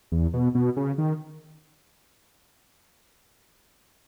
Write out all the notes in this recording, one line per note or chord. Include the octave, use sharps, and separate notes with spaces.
E2
B2
B2
C#3
D#3